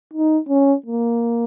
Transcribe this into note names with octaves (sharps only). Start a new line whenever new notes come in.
D#4
C#4
A#3